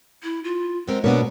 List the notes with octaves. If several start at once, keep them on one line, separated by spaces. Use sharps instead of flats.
E4
F4
G#3 B3 C4 A#4
B2 A#3 B3 D4 C#5